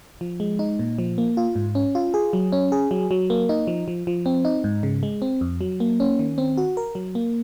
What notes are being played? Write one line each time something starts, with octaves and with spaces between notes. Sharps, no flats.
F3
G#3
D#4
A#2
F3
A#3
F4
G#2
C#4
F4
G#4
F#3
C#4
G#4
F#3
F#3
A#3
D#4
F3
F3
F3
C4
D#4
G#2
C#3
G#3
C4
F2
F#3
A#3
C#4
D#3
C4
F#4
A#4
F#3
A#3